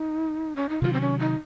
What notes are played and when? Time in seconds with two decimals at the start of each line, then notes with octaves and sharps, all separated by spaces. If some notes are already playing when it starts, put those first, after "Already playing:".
Already playing: D#4
0.56 C#4
0.69 D#4
0.82 C3 D#3 F#3 F4
0.93 C4
1.01 C#4
1.19 D#4